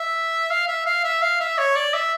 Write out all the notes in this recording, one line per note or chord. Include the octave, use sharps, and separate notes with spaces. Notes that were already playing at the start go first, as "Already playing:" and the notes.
Already playing: E5
F5
E5
F5
E5
F5
E5
C#5
D5
E5